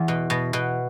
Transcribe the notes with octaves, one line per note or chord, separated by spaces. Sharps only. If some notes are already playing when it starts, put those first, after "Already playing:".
Already playing: E2
B2
B2
B2